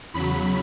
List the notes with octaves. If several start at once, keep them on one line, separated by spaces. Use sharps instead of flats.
E2 C#3 F#3 B5